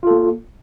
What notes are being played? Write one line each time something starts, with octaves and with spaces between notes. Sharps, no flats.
A#3 F4 A4